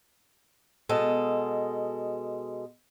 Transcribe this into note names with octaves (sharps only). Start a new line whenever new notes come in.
B2 G#3 A4